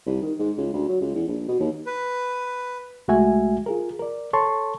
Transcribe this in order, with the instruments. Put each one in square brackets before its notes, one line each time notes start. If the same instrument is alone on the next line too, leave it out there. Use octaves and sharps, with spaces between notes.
[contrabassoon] C2
D#3
G#2
C#2
D2
F#3
C#2
E2
A#1
B2
D#2
[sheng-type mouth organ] B4
[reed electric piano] C2 G#3 A3 F#4 E5 G#5
F4 G#4 A#4
A#4 D5
A4 C#5 A5 C6 C#6